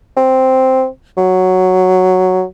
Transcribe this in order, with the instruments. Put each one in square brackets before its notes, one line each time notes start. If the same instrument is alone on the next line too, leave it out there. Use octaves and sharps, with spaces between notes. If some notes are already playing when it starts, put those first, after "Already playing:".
[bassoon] C4
F#3